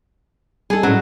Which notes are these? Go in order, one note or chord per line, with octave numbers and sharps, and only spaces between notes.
G3 D#4 G#4 A4
A2 F#3 C#4 G#4